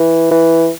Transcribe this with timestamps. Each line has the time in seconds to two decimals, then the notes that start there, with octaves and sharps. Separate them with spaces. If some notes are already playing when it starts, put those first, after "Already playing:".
Already playing: E3
0.31 E3